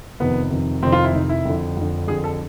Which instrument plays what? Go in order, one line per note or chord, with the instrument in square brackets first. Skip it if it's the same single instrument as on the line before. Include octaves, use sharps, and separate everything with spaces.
[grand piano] F2 C3 D#3 B3
F2 C3 D#3
F2 C3 D#3 C4
F4
E4
F2 C3 D#3 D#4
E4
F2 D3
F2 D3
F2 D3 G#4
A4